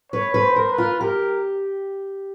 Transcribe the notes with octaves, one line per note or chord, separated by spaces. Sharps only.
B4 C#5
B4
C5
A#4
B4
F4
G4 A#4